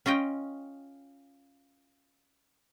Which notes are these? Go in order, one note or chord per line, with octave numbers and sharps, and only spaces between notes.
C#4 F4 D#5 G5